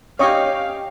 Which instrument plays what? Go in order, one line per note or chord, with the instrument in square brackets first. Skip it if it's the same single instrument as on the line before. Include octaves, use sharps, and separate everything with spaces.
[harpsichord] C#4 D#4 G4 [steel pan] C#5 D#5 C#6 [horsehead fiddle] F5 [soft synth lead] G5